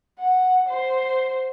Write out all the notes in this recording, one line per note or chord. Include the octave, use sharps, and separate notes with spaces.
F#5
C5